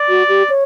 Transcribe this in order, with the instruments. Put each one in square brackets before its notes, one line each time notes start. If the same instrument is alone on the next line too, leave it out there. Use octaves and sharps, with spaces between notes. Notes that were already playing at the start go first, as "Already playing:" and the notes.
Already playing: [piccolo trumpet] D5
[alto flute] F#4
G4
C#5